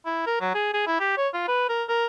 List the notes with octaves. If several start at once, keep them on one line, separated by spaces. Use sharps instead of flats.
E4
A#4
F#3
G#4
G#4
E4
G4
C#5
F4
B4
A#4
A#4